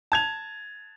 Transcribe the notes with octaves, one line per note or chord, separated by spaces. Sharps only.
A5 G#6 F7